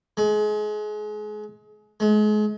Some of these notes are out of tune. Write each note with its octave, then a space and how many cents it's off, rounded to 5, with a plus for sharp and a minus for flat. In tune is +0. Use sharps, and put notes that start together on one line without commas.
G#3 +30
G#3 +35